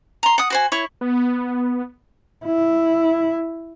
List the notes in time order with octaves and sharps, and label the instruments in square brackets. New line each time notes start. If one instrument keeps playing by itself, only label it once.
[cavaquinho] A#5 C6
F#5 D#6
F#4 C5 G#5
E4 C#5 C#6
[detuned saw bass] B3
[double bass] E4